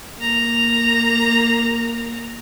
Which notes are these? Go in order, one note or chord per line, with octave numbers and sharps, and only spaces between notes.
A#3 A#5